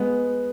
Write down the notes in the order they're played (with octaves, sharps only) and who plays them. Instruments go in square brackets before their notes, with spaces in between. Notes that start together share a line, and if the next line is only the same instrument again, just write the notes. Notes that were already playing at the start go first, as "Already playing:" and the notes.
Already playing: [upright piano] G#3 B3